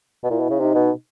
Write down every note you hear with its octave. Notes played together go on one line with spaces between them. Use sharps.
B2
A#2 E4
B2
C#3
C3 D#4
B2